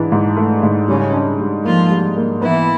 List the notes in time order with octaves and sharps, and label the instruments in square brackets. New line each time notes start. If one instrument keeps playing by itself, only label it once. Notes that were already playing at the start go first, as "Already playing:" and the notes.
Already playing: [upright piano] G#2 E3 D4
G#2
A3
G#2
[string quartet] C#3 C#4 [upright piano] G3
[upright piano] D4
G3
[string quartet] F3 F4 [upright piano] A#3
[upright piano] G3
A#3
[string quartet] E3 E4 [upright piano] B3